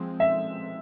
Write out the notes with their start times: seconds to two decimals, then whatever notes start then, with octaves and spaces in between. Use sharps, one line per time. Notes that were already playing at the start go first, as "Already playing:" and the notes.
Already playing: F3 G#3 C4
0.20 E5